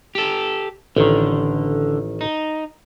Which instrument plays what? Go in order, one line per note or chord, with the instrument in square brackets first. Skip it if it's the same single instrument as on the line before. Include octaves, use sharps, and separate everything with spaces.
[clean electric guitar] G4 A4
[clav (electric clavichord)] A1 D#3 [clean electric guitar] D3
[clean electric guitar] D#4